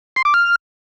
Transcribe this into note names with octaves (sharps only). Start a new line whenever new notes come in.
C6
D6
F6